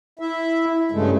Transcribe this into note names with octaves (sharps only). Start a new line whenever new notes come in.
E4 E5
G2 C#3 G#3 A3